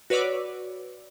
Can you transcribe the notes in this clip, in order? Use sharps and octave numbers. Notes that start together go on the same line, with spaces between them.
F#4 B4 C#5 D5 D6 E6